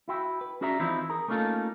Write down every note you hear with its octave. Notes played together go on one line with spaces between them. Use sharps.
E4 F#4 G5
B4
C#4 F#4 G#4 D5 E5 A#5
E3 F3 C4 D#4 E4
G#4 A#4
A3 A#3 C#4 D#4 F4 A4